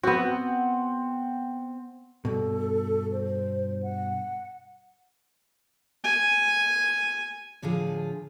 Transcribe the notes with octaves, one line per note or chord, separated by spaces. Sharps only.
B3 C4 F#4 F#5
G2 B2 A4
C5
F#5
G#5
A2 D3 F3 F4 G#4